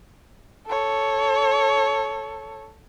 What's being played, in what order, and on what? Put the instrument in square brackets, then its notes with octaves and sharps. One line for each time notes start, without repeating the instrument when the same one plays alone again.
[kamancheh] A4 C#5